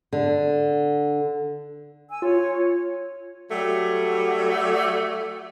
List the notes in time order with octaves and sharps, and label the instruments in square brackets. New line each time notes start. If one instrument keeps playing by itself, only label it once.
[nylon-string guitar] D3
[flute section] G#5 E6
[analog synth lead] F4 [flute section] C#5
[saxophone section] F#3 G3 A3 G4